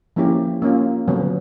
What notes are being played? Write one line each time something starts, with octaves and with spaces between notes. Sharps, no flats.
F3 A#3 C#4 E4 G4
A#3 C#4 F4
D3 F#3 B3